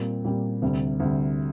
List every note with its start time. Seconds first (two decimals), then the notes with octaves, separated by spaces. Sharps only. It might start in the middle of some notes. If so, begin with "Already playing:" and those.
Already playing: A#2 G3 C4 G4
0.25 A#2 G3 C4 G4
0.62 D2 C3 G3
1.00 D2 C3 G3